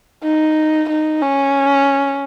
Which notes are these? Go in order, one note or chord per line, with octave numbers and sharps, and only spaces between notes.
D#4
D#4
C#4